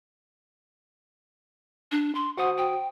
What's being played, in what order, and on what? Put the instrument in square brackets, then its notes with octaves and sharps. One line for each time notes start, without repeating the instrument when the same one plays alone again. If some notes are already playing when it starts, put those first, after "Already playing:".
[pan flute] D4
C6
[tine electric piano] F#4 C5 D#6 [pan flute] F#5
[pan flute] G5